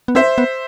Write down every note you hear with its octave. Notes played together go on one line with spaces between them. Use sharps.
B3
C4 C5 E5
B3